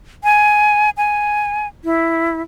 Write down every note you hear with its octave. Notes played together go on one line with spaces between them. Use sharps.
G#5
G#5
E4